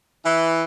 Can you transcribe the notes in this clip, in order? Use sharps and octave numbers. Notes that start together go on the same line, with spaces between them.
E3